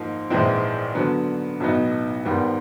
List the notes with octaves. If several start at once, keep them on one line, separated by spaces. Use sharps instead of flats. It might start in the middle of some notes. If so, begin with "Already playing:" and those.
Already playing: G#2 F3 A#3 D#4
A#1 G#2 E3 G#3 C4
D3 F#3 B3
B1 A2 F#3 B3 D#4
G#1 G#2 D#3 G3 B3